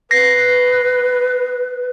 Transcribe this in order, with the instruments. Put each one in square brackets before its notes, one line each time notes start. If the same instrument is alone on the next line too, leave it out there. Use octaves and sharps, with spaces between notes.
[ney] B4 [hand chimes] A#6 C7